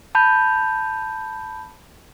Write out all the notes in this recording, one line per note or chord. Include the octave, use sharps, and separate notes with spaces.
A5 B5 G6